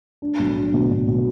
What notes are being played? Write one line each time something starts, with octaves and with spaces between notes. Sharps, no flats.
D4
B1
D4
B2
B2
B2